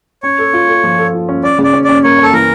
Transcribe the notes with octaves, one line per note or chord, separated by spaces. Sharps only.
C#4 C#5
A4
F4
A4
F3
A4
F4
C#4
C#4 D5
C#3
D5
C#4
C#4 D5
A#3 C#5
C#4 A4
E3 A#4